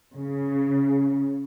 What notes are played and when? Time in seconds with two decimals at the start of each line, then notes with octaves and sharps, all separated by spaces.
0.15 C#3